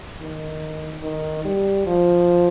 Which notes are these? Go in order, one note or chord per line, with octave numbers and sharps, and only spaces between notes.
D#3
D#3
G3
F3